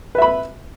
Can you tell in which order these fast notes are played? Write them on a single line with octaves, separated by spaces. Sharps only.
B4 E5 B5